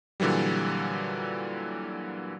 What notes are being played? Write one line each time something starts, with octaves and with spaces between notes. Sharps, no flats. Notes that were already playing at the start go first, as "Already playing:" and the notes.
A#2 D3 E3 F#3 G3